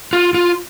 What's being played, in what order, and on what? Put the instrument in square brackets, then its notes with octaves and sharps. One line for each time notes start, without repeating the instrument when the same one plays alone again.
[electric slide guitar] F4
F4